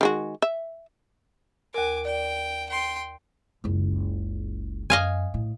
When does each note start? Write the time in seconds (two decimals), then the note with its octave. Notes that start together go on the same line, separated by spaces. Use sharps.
0.01 D#3 G#3 F#4
0.42 E5
1.74 D#2 A#4 G#5 D6
2.05 D5 G5
2.69 G5 C6
3.64 F#1 C#2
4.90 F#2 D#5 F5 G#5
5.34 A2